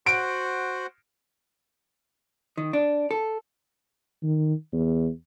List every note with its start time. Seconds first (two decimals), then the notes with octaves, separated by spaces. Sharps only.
0.06 F#4 C5 F#5 D7
2.57 D#3
2.73 D4
3.11 A4
4.23 D#3
4.72 E2